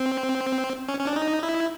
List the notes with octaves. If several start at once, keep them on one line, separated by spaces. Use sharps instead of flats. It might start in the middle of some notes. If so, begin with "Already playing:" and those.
Already playing: C4
C#4
C#4
D4
D#4
E4